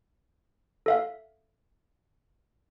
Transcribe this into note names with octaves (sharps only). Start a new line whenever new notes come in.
A4 E5 F5